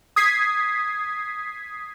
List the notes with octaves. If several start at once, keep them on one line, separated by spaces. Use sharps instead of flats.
D#6 G#6 B6 C7